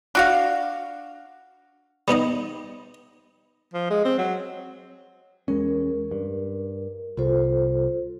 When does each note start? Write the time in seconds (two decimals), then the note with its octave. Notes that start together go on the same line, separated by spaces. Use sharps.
0.15 D4 F#4 F5
2.08 G3 B3 D#4 D#5
3.74 F3
3.90 G#3
4.05 C4
4.18 F#3
5.48 E2 G#3 C#4 A#4
6.11 G2
7.17 C2 F4 A4 C5